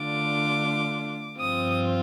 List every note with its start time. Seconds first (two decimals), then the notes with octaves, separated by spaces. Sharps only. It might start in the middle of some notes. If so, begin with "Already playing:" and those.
Already playing: D3 A3 D4 F4 D6
1.39 G2 F3 C4 F4 D#6